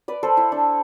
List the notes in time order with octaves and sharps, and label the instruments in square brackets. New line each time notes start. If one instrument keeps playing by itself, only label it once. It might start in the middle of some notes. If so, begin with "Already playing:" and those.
[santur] B4 D5
A4 C5
E4
D4